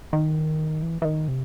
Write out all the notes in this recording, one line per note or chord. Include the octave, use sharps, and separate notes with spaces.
D#3
E3
E3
D#3
C3